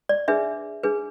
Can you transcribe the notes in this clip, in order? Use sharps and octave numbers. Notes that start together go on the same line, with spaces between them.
D5
D4 G#4 B4 E5
D4 G#4 B4